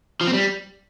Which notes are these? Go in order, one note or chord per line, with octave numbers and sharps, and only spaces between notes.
F3
C4
G3